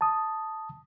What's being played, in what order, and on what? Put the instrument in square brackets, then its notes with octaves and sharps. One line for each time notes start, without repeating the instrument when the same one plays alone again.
[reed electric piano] A5 D#6